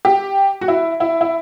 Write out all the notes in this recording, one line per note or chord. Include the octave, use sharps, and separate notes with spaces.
G4
F#4
E4
E4
E4